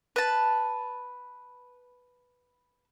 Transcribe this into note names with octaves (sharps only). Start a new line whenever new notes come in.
B4 A5